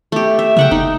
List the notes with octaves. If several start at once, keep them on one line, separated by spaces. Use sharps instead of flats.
A3 G4
E5
C#3 E5 F#5 G5
F1 D#4